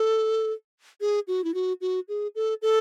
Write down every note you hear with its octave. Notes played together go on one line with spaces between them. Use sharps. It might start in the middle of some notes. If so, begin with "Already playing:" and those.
Already playing: A4
G#4
F#4
E4
F#4
F#4
G#4
A4
A4